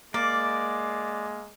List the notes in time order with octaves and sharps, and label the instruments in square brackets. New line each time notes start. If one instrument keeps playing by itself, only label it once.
[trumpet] G#3 [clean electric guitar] A#3 [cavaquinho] D5